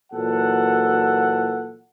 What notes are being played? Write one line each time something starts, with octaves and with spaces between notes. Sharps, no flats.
A#2 E3 F#3 A4 F#5